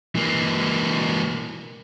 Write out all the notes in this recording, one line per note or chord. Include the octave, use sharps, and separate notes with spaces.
E3 A#3